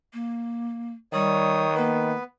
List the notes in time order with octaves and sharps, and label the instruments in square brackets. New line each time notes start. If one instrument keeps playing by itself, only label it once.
[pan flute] A#3
[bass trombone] D#3 [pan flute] G3 [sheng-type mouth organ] C#5 D#6
[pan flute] A#3 [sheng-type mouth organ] B3 B4